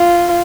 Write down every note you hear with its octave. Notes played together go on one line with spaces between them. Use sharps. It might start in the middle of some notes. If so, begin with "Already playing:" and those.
Already playing: F4